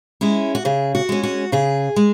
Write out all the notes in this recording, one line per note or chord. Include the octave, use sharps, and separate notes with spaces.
G#3 C#4 E4
F#4
C#3 G#4
F#4
G#3 C#4
F#4
C#3 G#4
G#3